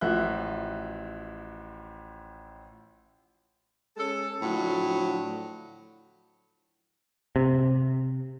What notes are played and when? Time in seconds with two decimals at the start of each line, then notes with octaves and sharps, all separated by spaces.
0.01 A1 F3 F#4 E5 F#6
3.97 G#3 C#4 A4
4.41 A2 D3 F3 F#3
7.36 C3